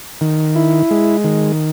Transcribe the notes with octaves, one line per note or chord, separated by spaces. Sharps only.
D#3
E4
G#3
D#3